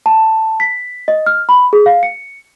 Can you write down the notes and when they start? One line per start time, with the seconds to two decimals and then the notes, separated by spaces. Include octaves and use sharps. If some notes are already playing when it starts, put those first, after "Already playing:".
0.06 A5
0.60 B6
1.08 D#5
1.26 F6
1.49 B5
1.73 G#4
1.86 F5
2.03 C#7